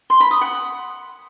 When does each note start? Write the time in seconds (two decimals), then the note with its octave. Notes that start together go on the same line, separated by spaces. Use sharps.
0.10 C6
0.20 B5
0.31 D#6
0.41 F#5